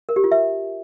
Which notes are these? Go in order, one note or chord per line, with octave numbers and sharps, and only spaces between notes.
A#4
G4
F4
E5